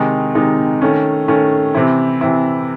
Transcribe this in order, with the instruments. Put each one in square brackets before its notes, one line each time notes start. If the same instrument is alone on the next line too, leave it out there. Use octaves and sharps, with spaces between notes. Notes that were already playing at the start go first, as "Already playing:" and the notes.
Already playing: [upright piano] C3 D#3 G#3 D#4
C3 D#3 G#3 D#4
D#3 A3 C#4
D#3 A3 C#4
C3 E3 C4 E4
C3 E3 C4 E4